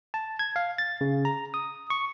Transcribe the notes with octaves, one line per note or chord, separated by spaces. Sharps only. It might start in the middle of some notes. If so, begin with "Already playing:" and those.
A5
G#6
F5
A6
C#3
A#5
D#6
C#6